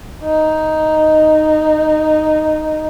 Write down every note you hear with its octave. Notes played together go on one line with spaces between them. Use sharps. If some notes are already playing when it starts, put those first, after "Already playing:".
D#4